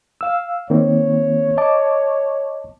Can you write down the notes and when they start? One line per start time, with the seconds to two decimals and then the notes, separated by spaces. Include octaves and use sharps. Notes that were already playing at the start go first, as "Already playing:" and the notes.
0.21 F5 E6
0.70 D#3 A#3 C4 C#5
1.57 D#5 A5 D6